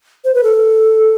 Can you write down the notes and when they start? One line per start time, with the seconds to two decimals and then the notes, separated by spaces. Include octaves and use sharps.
0.25 C5
0.34 B4
0.43 A4